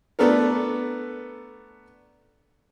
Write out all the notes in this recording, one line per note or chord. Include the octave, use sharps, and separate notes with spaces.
A3 B3 D4 A4 A#4